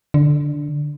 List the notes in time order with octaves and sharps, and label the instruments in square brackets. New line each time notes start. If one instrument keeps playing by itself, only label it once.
[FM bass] D3